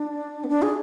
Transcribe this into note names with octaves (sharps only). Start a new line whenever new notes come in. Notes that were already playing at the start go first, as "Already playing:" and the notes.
Already playing: D4
B3
D4
G#4